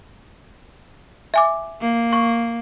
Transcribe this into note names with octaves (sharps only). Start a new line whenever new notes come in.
E5 G#5 D6
A#3
C#6